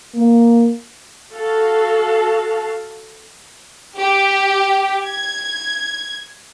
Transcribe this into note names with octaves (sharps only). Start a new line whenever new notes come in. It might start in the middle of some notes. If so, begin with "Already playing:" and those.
A#3
F#4 A4 F5 A5
G4
G#6